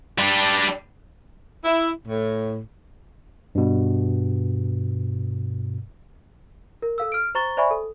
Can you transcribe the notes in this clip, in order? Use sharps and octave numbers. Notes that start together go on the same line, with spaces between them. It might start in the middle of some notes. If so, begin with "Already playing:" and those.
G3 D4
E4
A2
G2 B2
A#4
A4 F5 E6
F6 D7
C5 A#5 C#6 A6 G7
C5 D5 E5 G#5 B5 C#6
A4